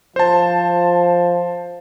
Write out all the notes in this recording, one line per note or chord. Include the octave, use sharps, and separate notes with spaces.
F3 C5 A5